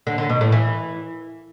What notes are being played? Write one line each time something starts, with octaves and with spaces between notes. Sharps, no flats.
D3
D3
B2
A2
E3